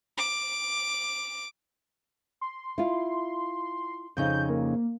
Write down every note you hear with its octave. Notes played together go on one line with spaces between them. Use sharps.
D6
C6
E4 F4
F2 C#3 D#4 G6
A#3